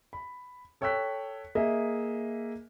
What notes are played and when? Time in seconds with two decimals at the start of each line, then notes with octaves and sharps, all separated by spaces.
0.13 B5
0.81 A4 C#5 G5 E6 F#6 B6
1.55 A#3 G#4 D#5 E5